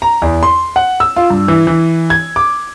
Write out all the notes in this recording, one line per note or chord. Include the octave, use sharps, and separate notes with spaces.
A#5
E2
C6
F#5
E6
F4
G2
E3
E3
G#6
D6